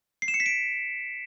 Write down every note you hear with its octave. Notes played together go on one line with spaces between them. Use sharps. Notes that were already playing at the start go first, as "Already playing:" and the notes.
C7
E7
C#7
B6
D7